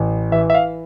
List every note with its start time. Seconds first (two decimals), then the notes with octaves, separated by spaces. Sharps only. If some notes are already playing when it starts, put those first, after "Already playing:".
Already playing: A1
0.32 E3 E5
0.50 E5
0.55 F5